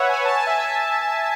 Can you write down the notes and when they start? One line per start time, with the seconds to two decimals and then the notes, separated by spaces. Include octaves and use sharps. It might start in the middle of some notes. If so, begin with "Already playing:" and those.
Already playing: B4 C#5 E5 F#5
0.09 G#5
0.25 A5
0.35 G#5
0.47 E5
0.58 E5